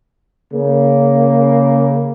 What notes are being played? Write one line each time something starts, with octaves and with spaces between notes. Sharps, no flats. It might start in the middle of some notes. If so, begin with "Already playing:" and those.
C#3 A#3